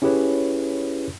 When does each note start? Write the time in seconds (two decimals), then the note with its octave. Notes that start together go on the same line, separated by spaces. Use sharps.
0.02 C#4 E4 G4 G#4 B4 C#5